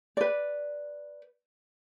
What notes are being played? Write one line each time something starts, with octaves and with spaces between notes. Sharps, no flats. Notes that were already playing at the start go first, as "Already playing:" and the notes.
B4 D5